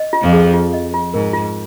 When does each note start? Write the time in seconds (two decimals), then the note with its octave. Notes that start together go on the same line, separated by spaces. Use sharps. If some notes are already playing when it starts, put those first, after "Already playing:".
Already playing: D#5
0.13 F4
0.22 F2 F3
0.32 G#4
0.53 F4
0.73 D#5
0.94 F4
1.14 G#2 A#4
1.33 F4